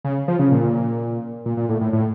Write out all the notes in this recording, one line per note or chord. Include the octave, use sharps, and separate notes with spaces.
C#3
F3
C#3
A#2
A#2
A#2
A2
A2
A2